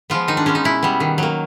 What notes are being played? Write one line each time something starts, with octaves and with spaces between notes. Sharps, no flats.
F3 G#3 B3 F4
D#3 D#4
D4
G#3 B3 C#4
D#4
B2 E4
G3 B3
D#3
F#3 A#3